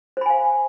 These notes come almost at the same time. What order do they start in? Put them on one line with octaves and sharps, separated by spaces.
C5 B5 G#5 F5